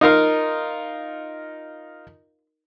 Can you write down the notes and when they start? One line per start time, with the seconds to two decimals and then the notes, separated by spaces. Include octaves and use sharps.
0.01 D#4 F4 A#4 F5